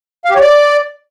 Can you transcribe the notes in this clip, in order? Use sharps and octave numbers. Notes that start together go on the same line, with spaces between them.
F5
G4
C#5
D5